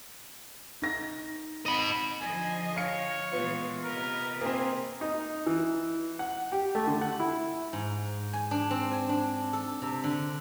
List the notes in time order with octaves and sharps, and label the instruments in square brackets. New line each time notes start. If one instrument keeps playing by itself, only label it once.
[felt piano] D#4 A#6
[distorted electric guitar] D#5 B5
[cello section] D3 F3 D#5 [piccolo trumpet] G#5
[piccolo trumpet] C#5 [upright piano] F5 C#7
[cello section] A#2 E3 G#3 [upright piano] B3 F4
[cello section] C3 B4 D#5 [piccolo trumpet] A#4
[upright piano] A#3 C4 [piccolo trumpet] G#4
[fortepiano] D#4
E3
F#5
G4
A3
D3
F#5
E4
[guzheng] G#2
G#5
D4
C4
G#5
D4
A4
C3
D3